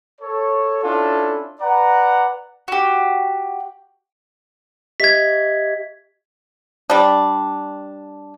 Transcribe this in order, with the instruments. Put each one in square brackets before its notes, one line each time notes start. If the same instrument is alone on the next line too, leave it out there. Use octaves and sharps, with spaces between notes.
[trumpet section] A4 C#5
C#4 D4 E4 F4 A4
B4 D5 F#5 A#5
[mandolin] F#4 G4
[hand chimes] G4 D#5 E5 [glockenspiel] G#6 B6
[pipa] G3 D4